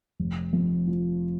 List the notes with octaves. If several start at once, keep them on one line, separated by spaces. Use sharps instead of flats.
F1
F2
F3